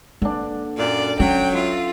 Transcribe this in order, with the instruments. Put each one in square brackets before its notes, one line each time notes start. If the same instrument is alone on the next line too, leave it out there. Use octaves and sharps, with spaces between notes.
[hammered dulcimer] D3 D4 [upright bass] A#3
[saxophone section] F#2 A#2 [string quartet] D5
[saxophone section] F#3 [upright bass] C#4 [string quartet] G5
[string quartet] F4 [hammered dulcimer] E5 F5